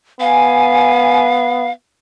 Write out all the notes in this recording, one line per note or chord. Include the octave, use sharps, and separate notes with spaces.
B3 F5 G#5